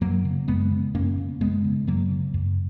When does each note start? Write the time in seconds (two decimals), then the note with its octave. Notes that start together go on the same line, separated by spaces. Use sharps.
0.01 F#2 F#3 A#3
0.25 C#3
0.48 F#2 G#3 B3
0.71 C#3
0.94 F#2 A#3 C#4
1.18 C#3
1.41 F#2 G#3 B3
1.64 C#3
1.87 F#2 F#3 A#3
2.11 C#3
2.34 F#2